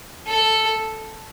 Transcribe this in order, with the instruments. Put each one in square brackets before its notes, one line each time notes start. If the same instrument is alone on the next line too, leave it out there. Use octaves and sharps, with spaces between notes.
[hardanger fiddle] A4